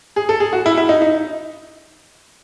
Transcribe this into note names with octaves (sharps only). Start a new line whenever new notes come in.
G#4
A4
G#4
F#4
E4
E4
D#4
D#4